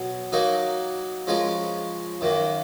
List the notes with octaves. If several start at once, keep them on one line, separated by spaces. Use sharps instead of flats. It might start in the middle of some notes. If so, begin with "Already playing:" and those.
Already playing: B2 F#3 B3
F#3 A#3 D#4 A#4
F3 G#3 C#4 F4 A#4
F#2 D#3 A#3